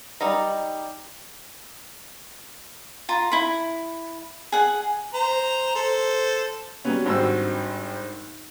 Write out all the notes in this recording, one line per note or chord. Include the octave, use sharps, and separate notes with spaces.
G3 D#4 A#5
F4 A#5
E4 B5
G#4 F#5
C5 A#5
A4 C5
F#3 G3 B3 C#4
G#1 G2 C4 F#4 E6